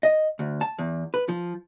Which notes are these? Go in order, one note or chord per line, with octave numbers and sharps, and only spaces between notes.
D#5
D2
A5
E2
B4
F3